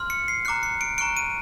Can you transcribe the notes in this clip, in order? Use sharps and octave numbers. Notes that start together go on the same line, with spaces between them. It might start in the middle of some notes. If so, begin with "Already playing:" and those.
Already playing: C6 F6
C#7
C7
A#5 D6 F#6 C#7
C#7
D7
A#5 C#6 F#6 D7
D#7